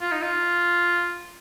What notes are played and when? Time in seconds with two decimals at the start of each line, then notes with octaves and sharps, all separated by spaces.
0.01 F4
0.12 D#4
0.22 F4